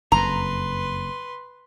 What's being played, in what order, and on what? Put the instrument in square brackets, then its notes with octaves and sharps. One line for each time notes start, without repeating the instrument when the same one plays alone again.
[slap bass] F#1 F2 [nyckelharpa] B4 C6 [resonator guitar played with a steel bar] A#5